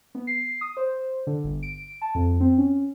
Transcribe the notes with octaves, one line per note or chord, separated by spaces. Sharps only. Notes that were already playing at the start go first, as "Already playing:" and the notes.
B3
C7
D#6
C5
D3
G1
D7
A5
F2
C4
C#4